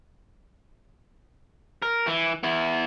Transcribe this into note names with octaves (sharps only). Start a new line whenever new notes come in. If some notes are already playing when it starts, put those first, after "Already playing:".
A#4
E3
B3 E4